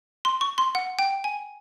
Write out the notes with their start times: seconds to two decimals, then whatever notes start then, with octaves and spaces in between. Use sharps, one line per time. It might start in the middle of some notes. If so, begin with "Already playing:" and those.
0.25 C6
0.41 C#6
0.58 C6
0.75 F#5
0.99 G5
1.24 G#5